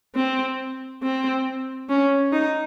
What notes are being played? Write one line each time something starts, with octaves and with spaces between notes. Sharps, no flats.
C4
C4
C#4
D#4